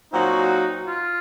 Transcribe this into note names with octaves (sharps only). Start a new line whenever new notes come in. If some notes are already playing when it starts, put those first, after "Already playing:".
A#2 F#3 C4 D#4 F#4
F4